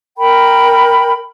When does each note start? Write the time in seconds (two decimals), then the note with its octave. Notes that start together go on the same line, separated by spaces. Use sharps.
0.18 A#4 G5 B5